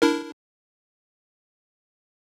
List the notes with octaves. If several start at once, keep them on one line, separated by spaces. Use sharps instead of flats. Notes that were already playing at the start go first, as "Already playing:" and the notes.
D4 E4 A#4